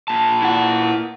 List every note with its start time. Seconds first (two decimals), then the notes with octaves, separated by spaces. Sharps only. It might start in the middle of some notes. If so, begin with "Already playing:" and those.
0.08 A#2 A5
0.42 E4 F#5